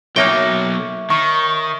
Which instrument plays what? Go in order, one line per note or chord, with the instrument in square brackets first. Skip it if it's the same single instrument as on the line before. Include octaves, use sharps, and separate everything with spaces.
[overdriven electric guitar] B1 F#3 [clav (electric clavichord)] A#3 D#4 G5 [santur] C#5 E5
[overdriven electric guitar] D#3 [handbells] C#6